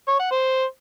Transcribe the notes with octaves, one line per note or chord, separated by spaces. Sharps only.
C#5
F#5
C5